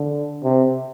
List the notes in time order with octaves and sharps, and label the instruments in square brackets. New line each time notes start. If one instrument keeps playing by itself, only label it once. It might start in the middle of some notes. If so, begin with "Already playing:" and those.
Already playing: [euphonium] D3
C3